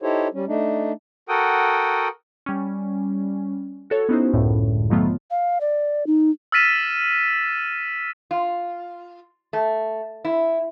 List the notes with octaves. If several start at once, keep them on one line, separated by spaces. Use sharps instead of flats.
D#4 E4 G4 A4 C5 C#5
G3 C#4
A3 D4 D#4
F#4 A4 A#4 F#5 G5 D#6
G3 C#4
F#4 A4 C#5
B3 C#4 D#4 E4 F#4 C5
C#2 F#2 A2 D3
F2 D#3 F#3 A3 B3 F4
F5
D5
D#4
E6 F6 A6 B6 D#7 E7
F4
A3
E4